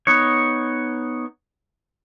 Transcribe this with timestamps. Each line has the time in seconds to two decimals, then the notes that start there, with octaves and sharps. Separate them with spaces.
0.07 B3 D#4 C#5